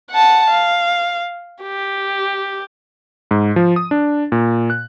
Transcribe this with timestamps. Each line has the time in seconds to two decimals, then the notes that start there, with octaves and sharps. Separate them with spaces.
0.11 F#5 A5
0.50 F5
1.62 G4
3.31 G#2
3.56 F3
3.76 D#6
3.91 D4
4.32 A#2
4.70 F#6